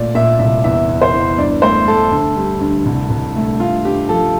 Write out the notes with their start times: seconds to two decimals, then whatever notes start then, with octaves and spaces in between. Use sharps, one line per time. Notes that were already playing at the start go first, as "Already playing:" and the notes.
Already playing: A#2 A3 D5
0.15 A#2 E5
0.39 C2 E5
0.64 E2 E5
0.89 E2
1.01 C5
1.13 E2
1.38 G2 D5
1.62 A3 C5
1.88 A3 A4
2.11 D2
2.36 G3
2.61 D2
2.86 C2
3.10 C2
3.36 A3
3.60 G2 F4
3.85 G2 G4
4.09 F3 A4